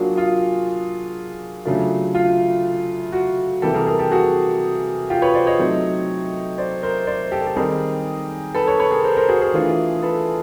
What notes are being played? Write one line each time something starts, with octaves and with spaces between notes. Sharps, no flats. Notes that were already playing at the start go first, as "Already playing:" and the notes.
Already playing: F#3 A#3 D4 F4 F#4 G#4
F4
C#3 F#3 A3 D4 F4
F4
F#4
C3 E3 G3 A#3 G4 A4
G#4 A#4
G#4 A#4
G4 A4
F#4 G#4
F4 G4
B4 C#5
C5 D5
C#5 D#5
F#3 A3 C4 D#4
C5 D5
A#4 C5
C5 D5
G4 A4
A4
D#3 G3 C4 D#4 G#4 A#4
A4 B4
B4 C#5
B4 C#5
G#4 A#4
A#4 C5
A#4 C5
F#4 G#4
G#4 A#4
E3 A3 D4 F4
A4 B4